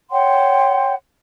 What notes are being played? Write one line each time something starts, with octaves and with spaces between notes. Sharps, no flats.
C#5 F#5 G5 C6